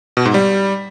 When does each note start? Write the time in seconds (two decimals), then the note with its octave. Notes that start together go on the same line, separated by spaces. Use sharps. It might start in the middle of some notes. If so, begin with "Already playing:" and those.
0.17 B2
0.25 G#2
0.34 G3